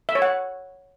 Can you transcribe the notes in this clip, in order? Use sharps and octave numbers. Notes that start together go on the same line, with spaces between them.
E5
C#5
F#5